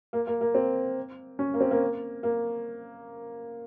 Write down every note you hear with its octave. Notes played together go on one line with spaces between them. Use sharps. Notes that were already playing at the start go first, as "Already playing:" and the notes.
A#3
A#3
A#3
C4
C#4
A#3
C4
A#3
A#3